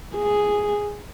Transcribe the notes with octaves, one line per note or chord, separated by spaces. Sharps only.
G#4